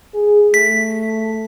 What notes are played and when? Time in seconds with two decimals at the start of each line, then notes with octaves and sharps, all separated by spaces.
0.14 G#4
0.54 A3 B6